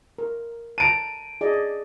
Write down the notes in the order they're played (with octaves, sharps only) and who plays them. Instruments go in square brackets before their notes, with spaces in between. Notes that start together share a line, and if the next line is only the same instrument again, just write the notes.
[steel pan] A#4
[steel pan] A5 A#5 [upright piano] D7 D#7
[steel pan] G#4 D5 D#5